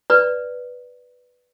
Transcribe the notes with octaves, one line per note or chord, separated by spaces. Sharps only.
B4 D5